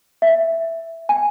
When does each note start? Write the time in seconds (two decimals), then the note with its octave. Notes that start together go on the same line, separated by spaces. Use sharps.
0.22 E5
1.09 G#5